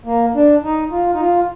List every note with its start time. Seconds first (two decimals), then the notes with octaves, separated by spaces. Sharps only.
0.06 A#3
0.35 D4
0.64 D#4
0.91 F4
1.13 D#4
1.20 F4